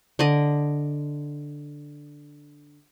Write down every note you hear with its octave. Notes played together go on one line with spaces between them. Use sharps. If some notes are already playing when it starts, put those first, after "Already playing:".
D3 D5 D#5